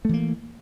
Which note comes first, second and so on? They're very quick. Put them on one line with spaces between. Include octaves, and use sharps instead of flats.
A3 E3 A#3